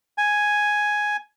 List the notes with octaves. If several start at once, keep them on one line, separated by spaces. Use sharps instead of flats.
G#5